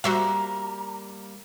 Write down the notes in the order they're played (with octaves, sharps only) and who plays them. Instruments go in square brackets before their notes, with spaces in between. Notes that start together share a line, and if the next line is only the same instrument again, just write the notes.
[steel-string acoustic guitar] G3 A#3 [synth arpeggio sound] F#4 C5 E5 [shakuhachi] A#5